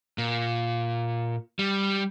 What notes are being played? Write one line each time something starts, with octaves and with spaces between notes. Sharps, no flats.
A#2
G3